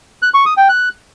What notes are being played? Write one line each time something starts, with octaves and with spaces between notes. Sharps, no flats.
F#6
C#6
D#6
G5
F#6